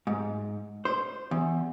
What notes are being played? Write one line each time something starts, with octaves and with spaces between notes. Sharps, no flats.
G#2
C5
E2